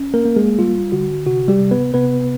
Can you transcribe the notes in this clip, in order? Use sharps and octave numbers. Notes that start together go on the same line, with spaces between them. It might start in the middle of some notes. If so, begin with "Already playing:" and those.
Already playing: C#4
A#3 A#4
A#3
G#3 G#4
G3 F4
D3 F#4
C3 F#4
G3 G4
C3
B3 B4
C3 B3 B4